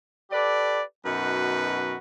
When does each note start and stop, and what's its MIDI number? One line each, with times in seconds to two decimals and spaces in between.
0.31 0.81 67
0.31 0.81 69
0.31 0.81 71
0.31 0.81 74
1.06 1.97 42
1.06 1.97 47
1.06 1.97 63
1.06 1.97 66
1.06 1.97 71